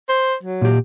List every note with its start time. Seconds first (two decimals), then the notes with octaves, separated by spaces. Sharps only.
0.09 C5
0.43 F#3
0.62 A#2 G4